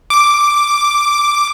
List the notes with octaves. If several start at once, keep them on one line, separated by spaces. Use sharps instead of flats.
D6